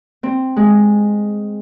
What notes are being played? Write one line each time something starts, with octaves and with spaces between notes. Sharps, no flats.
C4
G#3